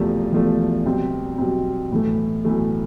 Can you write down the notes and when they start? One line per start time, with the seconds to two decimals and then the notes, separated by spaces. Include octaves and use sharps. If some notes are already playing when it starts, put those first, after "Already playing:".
Already playing: E1 E2 C3 F3 A3
0.32 E1 E2 C3 F3 A3
0.86 B1 B2 G3 C4
1.38 B1 B2 G3 C4
1.91 B1 A2 E3 A3
2.45 B1 A2 E3 A3